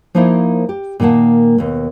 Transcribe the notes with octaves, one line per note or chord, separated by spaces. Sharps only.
F3 A#3 D#4 E4 A#4 C5
G4
A#2 D#3 A#3 F#5 A5
D#2 B2